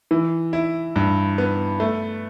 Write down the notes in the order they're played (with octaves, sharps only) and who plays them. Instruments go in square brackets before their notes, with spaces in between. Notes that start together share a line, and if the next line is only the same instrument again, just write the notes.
[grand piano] E3
E4
G2
B3
A3